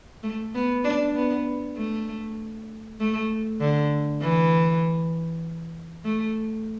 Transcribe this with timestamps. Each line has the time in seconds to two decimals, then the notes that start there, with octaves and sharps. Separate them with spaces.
0.23 A3
0.55 B3
0.84 D4
1.15 B3
1.76 A3
3.00 A3
3.61 D3
4.21 E3
6.05 A3